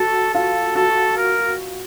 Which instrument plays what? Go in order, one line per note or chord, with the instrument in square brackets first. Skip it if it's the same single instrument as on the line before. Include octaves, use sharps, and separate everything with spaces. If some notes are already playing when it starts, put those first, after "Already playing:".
Already playing: [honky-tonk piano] F#4 [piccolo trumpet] A4
[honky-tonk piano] F4 [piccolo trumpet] A4
[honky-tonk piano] F#4 [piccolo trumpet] A4
[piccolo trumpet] A#4